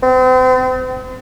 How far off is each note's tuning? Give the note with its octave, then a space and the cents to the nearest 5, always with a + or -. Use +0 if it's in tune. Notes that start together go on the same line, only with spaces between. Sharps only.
C4 -40